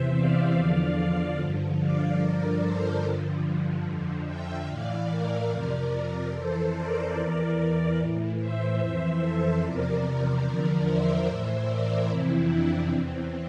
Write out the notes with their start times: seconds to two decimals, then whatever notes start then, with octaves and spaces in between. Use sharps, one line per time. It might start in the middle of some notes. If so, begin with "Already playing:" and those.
Already playing: E2 C3 E3 C5 E5
0.13 D5 F5
0.55 E2 D3 F3
1.38 G2 D3 F3
1.79 D5 F5
2.20 G2 D3 F3 A#4 D5
2.61 A4 C5
3.02 G2 D3 F3
3.85 F2 D3 F3
4.25 E5 G5
4.67 A2 E3 D5 F5
5.08 A#4 D5
5.49 F2 C3 F3 A#4 D5
6.32 F2 E3 A4 C5
6.73 A#4 D5
7.14 E2 E3
7.96 A2 E3
8.37 C5 E5
8.78 F2 E3
9.20 A4 C5
9.61 E2 C3 F3 A#4 D5
10.43 E2 D3 F3 A#4 D5
10.84 C5 E5
11.26 A2 E3 C5 E5
11.67 A#4 D5
12.08 F2 C3 E3 C4 E4
12.50 D4
12.91 E2 E3 C4